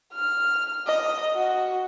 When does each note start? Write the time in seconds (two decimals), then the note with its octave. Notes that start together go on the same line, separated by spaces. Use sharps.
0.13 F6
0.87 D#5
1.35 F#4